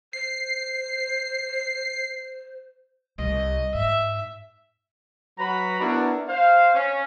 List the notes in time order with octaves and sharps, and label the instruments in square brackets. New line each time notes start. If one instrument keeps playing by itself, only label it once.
[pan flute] C5 [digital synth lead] C7
[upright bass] C2 [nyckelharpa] D#5
[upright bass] G#2 [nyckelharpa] E5
[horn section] F#3 F#4 B4 A#5 B5
B3 D4 E4 F#4 A#4
C5 F5
C#4